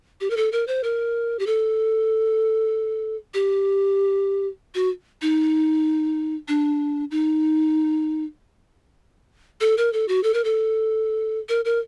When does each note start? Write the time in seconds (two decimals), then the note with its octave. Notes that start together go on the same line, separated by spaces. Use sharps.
0.21 G4
0.30 A#4
0.37 A4
0.52 A#4
0.67 C5
0.84 A#4
1.39 G4
1.47 A4
3.34 G4
4.75 F#4
5.22 D#4
6.48 D4
7.11 D#4
9.61 A4
9.78 A#4
9.93 A4
10.08 F#4
10.23 A4
10.34 A#4
10.44 A4
11.49 A#4
11.65 A#4